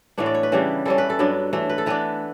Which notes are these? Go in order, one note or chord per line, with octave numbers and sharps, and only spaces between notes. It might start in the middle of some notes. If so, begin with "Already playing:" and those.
A2 E3 B3 D4 C#5
D5
C#5
B4
C#3 E3 G3 D4
E3 G3 C#4 A4
B4
A4
G2 F#3 B3 D4
E3 A3 D4
B4
A4
E3 B3 D4 B4